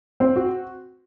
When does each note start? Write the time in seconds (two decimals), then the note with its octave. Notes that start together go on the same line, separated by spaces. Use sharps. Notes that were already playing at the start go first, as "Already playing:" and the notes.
0.20 C4
0.36 F#4